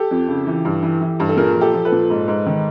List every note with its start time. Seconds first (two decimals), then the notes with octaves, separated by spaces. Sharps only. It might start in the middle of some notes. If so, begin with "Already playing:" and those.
Already playing: G4 A4
0.11 F2
0.28 C#3
0.47 E3
0.65 G2
0.83 E3
1.01 E3
1.20 G2
1.29 A4
1.37 A#2 G#4 A#4
1.55 F3
1.61 G4 A4
1.74 F3
1.85 A4 B4
1.92 A#2
2.10 G#2
2.28 G#2
2.47 D#3